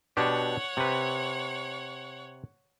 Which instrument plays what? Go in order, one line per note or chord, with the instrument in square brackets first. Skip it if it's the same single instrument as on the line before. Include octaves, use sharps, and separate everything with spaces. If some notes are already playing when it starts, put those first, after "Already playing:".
[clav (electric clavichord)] B2 D4 G4 [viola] C#5 F#5
[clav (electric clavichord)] C3 B4